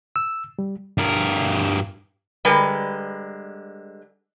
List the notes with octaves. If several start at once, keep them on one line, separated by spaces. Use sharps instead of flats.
E6
G3
G2 A#4
D3 G3 G#3 A#4 B4